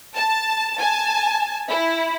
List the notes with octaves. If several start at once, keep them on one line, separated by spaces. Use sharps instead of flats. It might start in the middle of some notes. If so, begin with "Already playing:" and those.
A5
G#5 A5
E4